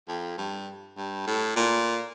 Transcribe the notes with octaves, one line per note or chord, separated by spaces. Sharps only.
F2
G2
G2
A2
A#2